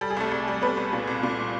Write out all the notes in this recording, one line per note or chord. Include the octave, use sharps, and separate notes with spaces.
G3 A4
G#4
C2 A3 A4
C2
G3
G3 B3 B4
C2
A#2
C2
A#2